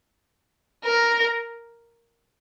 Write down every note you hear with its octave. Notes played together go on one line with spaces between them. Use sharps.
A#4